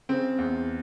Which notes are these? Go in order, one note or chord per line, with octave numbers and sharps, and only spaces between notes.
C#3 C4
E2